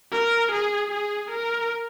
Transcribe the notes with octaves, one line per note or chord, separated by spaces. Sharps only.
A#4
G#4
G#4
A#4